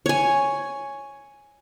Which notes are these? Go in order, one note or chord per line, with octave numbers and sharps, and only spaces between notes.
C#5 G#5